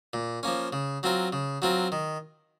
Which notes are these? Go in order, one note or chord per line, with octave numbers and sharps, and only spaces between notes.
A#2
F3 A#3 C#4
C#3
F#3 C4 F4 A#4
C#3
F#3 C4 F4 A#4
D#3